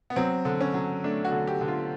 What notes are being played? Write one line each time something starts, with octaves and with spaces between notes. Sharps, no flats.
B3
F#3 C4
D3
C#4
F#3
A3 D4
F#4
D3
G4
D3
F4